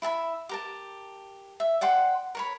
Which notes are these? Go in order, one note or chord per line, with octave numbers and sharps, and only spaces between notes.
E4 E5 A5 B5
G4 A#4 A5
E5
D5 F#5 G5 C6
A#4 C#5 B5